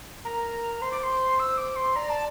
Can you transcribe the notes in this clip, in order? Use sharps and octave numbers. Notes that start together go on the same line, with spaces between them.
A#4 A#5
C5 C6
D6
C6
E6
D6
C6
D5 A#5
A5